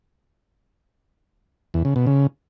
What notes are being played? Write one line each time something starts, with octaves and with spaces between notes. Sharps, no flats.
E2
C#3
B2
C#3